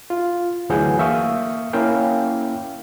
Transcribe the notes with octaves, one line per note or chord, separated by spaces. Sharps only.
F4
D2 E3 F#3 G#4 F#5 G6
A#3 E5 F5 C#6 D#6
A#3 C#4 E4 F5 G5